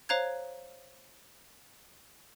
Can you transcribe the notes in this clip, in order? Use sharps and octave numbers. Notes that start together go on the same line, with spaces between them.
C5 C#5 F5 A#5 F#6 G#6